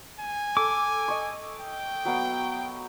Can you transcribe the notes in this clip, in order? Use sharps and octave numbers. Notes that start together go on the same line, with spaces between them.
G#5
A4 D6
D#5 C#6
G5
F#3 B3 F5